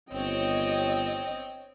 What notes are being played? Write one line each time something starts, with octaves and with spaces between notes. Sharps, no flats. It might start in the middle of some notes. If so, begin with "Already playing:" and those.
G1 C4 C#5 D#5 G5